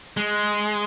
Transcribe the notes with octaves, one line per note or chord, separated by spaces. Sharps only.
G#3